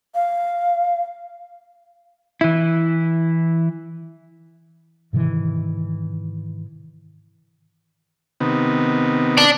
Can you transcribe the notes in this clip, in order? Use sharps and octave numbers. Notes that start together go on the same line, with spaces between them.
F5
E3 E4
G#2 C3 D#3 E3
C3 D#3 B3
D5 A5